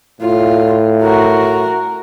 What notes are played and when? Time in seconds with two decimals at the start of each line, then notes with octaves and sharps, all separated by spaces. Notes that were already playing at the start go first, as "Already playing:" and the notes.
0.21 A2 F4
1.02 F#4 A#4